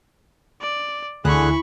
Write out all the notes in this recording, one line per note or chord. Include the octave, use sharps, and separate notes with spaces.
D5
D2 D3 E3 G#4 B5 C#6 F#6